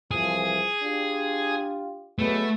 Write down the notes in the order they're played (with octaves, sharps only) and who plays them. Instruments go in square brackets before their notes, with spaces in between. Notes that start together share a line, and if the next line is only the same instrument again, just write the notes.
[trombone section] C2 E3 F3 [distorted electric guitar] G#4
[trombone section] D4 F4 G4
[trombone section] F#3 G#3 B3 [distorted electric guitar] A3